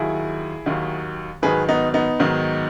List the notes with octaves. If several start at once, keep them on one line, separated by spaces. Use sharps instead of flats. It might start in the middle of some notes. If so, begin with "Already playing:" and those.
Already playing: D#2 D#3 F#3 E4 G#4
D#2 D#3 F#3
G#2 D#3 F#3 G#4 B4
B3 D#4
B3 D#4
G#2 D#3 F#3